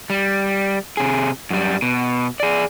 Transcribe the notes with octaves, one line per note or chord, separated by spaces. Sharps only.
G3
C3 G#4
F#2 G3
B2
G#4 D5